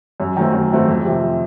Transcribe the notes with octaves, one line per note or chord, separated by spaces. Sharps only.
F#2
D#3 F#3 A3 C4
F#2
D#3 F#3 A3 C4
F2
C3 F3